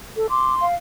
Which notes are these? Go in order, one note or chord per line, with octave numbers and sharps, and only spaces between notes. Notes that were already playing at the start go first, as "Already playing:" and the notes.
A4
C6 D6
F5